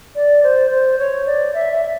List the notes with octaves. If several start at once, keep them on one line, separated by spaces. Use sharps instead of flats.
D5
C5
C5
C#5
D5
E5
E5